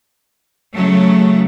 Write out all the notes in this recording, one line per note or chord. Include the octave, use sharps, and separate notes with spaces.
C#3 F#3 A3